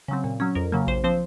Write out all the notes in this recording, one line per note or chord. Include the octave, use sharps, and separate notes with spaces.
C#3 F#3 C4
A#2
F#3 C#4
F2 A#4
C#3 F#3 A#3
A#1 C5
F3 C4 C5